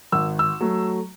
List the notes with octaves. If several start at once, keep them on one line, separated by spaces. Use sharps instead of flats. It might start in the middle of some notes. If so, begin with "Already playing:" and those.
G#1 E6
E6
F#3 A3